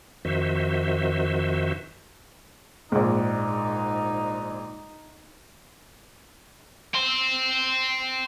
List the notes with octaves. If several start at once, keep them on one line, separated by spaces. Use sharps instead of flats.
F2 D#3 F#4 C5 E5
A#1 G#2 D#4
G5 C6